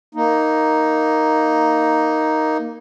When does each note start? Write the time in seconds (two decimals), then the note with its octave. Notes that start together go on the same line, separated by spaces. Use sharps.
0.15 A#3 D#4